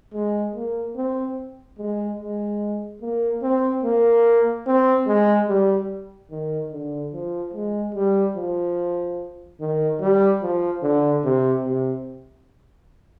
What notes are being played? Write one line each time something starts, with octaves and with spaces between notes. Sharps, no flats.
G#3
A#3
C4
G#3
G#3
A#3
C4
A#3
C4
G#3
G3
D#3
D3
F3
G#3
G3
F3
D#3
G3
F3
D3
C3
C3